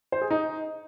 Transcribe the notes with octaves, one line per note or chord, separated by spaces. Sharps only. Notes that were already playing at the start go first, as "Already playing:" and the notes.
C5
G#4
D#4